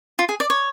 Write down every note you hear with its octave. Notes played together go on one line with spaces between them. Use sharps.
F4
G#4
D5
C#5